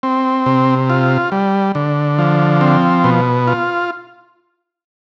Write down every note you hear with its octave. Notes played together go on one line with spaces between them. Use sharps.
C4
C3
F4
G3
D3
F3
C4
B2
F4